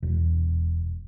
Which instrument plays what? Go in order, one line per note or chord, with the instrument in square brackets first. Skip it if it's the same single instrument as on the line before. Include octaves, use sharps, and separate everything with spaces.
[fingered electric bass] E1